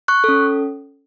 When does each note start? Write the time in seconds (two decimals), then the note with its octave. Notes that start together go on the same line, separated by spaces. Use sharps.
0.08 C#6 F#6
0.24 C#4 A4